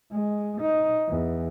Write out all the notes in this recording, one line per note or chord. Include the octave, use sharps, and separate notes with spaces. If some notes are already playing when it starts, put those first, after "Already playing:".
G#3
D#4
E2